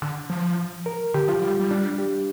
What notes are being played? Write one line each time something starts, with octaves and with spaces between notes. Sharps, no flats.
D3
F3
A#4
D3 G4
F3 F4
G3
G3
D4
G4